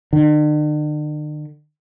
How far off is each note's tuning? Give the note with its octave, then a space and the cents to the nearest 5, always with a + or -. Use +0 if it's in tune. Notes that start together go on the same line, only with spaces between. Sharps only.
D3 +45